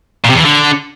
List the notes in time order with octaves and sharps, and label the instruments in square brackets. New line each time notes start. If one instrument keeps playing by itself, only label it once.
[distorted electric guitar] A#2
C3
E2
E3
D3